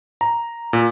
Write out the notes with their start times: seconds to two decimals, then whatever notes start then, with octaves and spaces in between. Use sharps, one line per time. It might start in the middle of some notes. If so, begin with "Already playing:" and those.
0.21 A#5
0.73 A#2